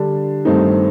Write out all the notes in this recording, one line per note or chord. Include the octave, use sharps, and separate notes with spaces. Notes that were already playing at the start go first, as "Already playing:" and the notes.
Already playing: D3 G3 D4
G2 D#3 A3 C4 D#4